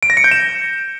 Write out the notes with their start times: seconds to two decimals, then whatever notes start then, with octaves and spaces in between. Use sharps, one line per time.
0.03 D7
0.10 A#6
0.17 C#7
0.24 G6
0.31 E7